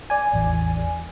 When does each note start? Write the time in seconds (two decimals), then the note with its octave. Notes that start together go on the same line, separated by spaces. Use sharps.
0.10 D5 G#5
0.33 A1 E2